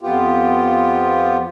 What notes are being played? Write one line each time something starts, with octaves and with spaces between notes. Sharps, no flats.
F2 B3 F4 G4